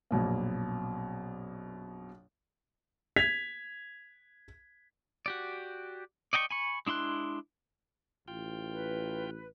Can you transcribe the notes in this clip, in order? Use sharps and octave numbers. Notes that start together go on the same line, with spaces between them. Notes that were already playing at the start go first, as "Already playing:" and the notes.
A#1 F#2 B2 A#3
G#6 B6 F7
F#4 G4 D5
D5 D#5 G5 A5 C#6
G#5 B5 C#6
G#3 D4 E4 C6 F#6
A1 F4 G5
B4